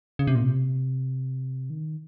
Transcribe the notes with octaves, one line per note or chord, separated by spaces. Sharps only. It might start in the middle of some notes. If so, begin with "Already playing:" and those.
C#3
C3
A#2
C3
D#3